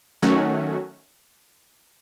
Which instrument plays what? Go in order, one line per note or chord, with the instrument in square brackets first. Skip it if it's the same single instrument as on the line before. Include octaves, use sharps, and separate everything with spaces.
[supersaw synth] D#3 F#3 A3 C#4 F#4